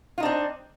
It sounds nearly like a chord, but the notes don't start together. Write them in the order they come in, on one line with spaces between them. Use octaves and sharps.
F4 D#4 D4 C4